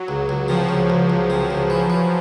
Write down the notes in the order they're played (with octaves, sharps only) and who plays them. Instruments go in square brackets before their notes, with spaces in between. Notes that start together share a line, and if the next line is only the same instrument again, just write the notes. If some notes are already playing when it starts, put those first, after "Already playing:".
Already playing: [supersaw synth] F#3
[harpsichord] C#2
C#2
[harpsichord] C3 [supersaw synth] F3
[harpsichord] C#2
C#2
C#2
C3
C#2
E3
E3